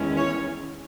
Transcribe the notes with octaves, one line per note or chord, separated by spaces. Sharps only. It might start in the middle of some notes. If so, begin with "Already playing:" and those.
Already playing: E2 D#3 G#3 C#4 E4
C#5